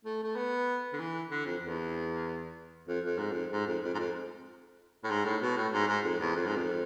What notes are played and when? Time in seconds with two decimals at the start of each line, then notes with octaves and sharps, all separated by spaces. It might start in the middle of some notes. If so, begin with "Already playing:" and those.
0.05 A3
0.23 A3
0.36 B3
0.93 D3
0.99 E3
1.30 D3
1.46 F2
1.63 E2
2.88 F2
3.05 F2
3.18 G#2
3.31 F2
3.52 G#2
3.67 F2
3.84 F2
3.94 G#2
3.99 F2
5.04 A2
5.10 G#2
5.25 A2
5.41 B2
5.57 A2
5.73 G#2
5.88 G#2
6.04 F2
6.20 E2
6.36 F2
6.46 G#2
6.56 F2